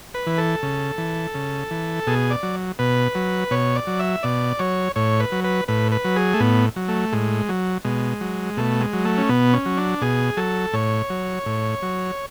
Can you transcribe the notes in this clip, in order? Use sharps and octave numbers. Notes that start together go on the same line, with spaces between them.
B4
E3
A4
C#3
E3
C#3
E3
B2 G#4
D5
F#3
B2 B4
F#3
B2 C#5
D5
F#3
E5
B2 D5
F#3 C#5
A2 C#5
B4
F#3
B4
A2 B4
B4
F#3
G#4
A3
A2 B3
F#3
A3
A2 G#3
F#3
B2 G#3
F#3
B2 A3
G#3
F#3
A3
C#4
B2 B3
C#4
F#3
D4
B2 G#4
F#3 A4
A2 C#5
F#3
A2
F#3